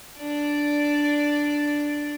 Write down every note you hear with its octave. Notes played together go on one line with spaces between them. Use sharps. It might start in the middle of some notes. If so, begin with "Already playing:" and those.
D4 D5